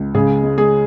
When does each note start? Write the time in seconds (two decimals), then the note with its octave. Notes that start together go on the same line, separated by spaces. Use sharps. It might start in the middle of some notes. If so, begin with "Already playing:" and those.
Already playing: C#2
0.14 C#3 G#3 G#4
0.43 G#3
0.58 G#3 G#4